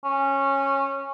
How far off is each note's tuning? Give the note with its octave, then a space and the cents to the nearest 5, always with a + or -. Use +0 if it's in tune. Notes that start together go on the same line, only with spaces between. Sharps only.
C#4 -15